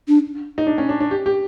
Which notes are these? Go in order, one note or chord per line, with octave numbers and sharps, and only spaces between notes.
D4
D#4
D4
C#4
D4
D4
G4
G4